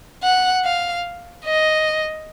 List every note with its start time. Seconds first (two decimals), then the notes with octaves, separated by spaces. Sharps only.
0.24 F#5
0.65 F5
1.45 D#5